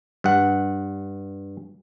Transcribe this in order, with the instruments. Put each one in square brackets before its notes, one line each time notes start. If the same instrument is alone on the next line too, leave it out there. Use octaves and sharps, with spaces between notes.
[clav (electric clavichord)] G2 F#5